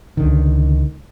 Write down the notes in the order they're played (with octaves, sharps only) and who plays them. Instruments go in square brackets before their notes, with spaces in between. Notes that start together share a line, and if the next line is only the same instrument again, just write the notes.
[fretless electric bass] C#2 D3 D#3